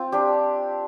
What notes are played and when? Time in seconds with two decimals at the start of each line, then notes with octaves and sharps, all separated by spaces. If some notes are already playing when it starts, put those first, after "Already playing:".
Already playing: C4 F4
0.12 D4 G4